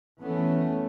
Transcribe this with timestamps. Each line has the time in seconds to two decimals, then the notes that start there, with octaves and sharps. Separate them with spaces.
0.22 E3 A3 B3 C#4